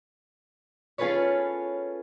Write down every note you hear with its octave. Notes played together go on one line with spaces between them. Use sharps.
C#4 F4 G#4 A4 B4 C#5